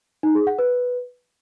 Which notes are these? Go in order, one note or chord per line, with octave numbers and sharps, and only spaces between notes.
D#4
G#4
F#5
B4